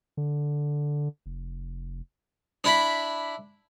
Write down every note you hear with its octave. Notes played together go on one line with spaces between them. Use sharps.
D3
F1
D4 E4 B5